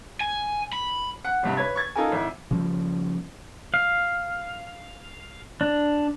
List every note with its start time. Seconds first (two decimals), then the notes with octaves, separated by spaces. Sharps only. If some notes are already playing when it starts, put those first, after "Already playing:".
0.21 G#5
0.73 B5
1.25 F#5
1.43 G#1 G2 C3
1.57 B4 C#5 G#6
1.76 C#6 G#6 A6
1.96 D#4 F4 A4 A#4 G#5
2.12 G#1 E4
2.51 C#3 F3 G3
3.74 F5
5.61 D4